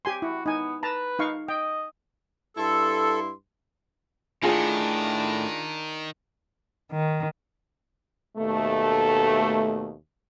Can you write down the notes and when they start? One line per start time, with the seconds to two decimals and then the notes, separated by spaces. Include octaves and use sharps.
0.05 G4 G#5 C6
0.22 E4 F#4
0.46 B3 D#4 G#5
0.83 B4 A5 A#5
1.19 D#4 F5 C#6
1.48 D#5 G5
2.57 G2 E4 A4 C6
4.43 A2 D#3 D4 F4 G#4
6.92 D#3
8.36 D#2 B2 A3